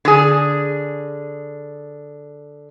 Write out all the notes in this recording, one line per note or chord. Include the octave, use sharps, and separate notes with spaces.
D3 G#4